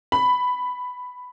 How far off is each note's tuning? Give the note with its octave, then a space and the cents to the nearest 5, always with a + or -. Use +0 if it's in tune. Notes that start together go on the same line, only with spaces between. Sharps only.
B5 +10